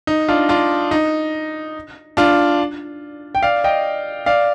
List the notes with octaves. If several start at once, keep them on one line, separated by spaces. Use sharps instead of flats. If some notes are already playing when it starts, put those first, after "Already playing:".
D#4
D4 F4
D4 F4
D#4
D4 F4
G5
D5 F5
D#5 G5
D5 F5